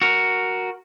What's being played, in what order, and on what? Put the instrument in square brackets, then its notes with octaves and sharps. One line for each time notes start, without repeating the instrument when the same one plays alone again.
[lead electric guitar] F#4 A#4